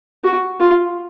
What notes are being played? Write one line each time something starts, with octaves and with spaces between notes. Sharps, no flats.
F#4
F4